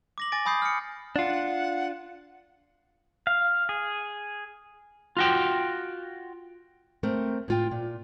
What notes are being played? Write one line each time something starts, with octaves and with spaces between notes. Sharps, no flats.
D6 A#6 F#7
G#5 D6 A6 A#6 D7
G#5 B5 D#6 G6 C7
F6 C#7
D4 F4 F#5
F5
G#4
F4 F#4 G5
A3 C4 A#4
A2 F4 G5
A#2